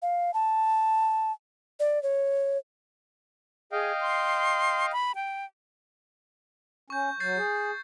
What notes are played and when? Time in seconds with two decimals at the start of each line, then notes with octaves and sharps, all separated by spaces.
0.02 F5
0.34 A5
1.80 D5
2.03 C#5
3.72 G#4 D#5 F5 G5
4.01 C6
4.92 B5
5.15 G5
6.90 C#4 C#6 G6
7.20 F#3 G6 A6 C7
7.37 G#4